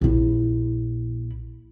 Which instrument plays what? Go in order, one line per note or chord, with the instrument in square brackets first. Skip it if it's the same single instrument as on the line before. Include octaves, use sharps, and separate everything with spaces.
[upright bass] A#1 E4